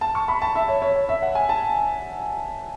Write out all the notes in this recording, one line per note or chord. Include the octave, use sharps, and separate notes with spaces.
A5
C#6
B5
A5
E5
C#5
C#5
C#5
E5
F#5
G#5
A5